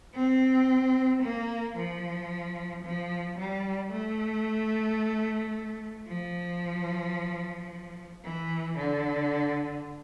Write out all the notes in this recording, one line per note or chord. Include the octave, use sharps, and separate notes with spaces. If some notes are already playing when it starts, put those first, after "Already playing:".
C4
A#3
F3
F3
G3
A3
F3
E3
D3